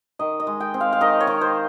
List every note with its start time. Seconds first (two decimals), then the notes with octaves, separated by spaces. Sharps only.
0.19 D#3 D#5
0.40 D#5
0.47 G#3
0.60 G5
0.74 C4
0.80 F5
0.93 F5
1.01 D#3 D#5
1.21 C#5
1.27 D#3
1.41 C5